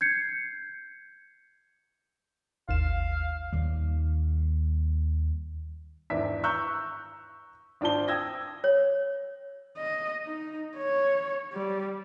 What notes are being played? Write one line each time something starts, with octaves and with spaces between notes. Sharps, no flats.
G6 G#6 C7 C#7
G#1 D#2 F5 E7
D#2 G3
E2 G#2 D#3 D4 E5 B6
A#5 C#6 E6 F#6 G6
G#1 D4 F4 C5 A5 G7
G5 D#6 E6 G#6 A#6
C#5
D#5
D#4
C#5
G3